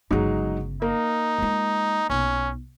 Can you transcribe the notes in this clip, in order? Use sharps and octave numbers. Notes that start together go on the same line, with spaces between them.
G1 C#3 F#3 G#3 D#4
A#3 D#4
G#3 F4
B1 C#4